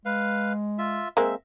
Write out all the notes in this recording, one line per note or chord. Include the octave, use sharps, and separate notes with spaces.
G#3 B4 F5
F4 E5
G#3 A#3 C4 E5